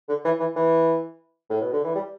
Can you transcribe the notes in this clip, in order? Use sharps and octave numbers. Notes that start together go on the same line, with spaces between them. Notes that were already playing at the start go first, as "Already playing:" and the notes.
D3
E3
E3
E3
A2
B2
D3
E3
G3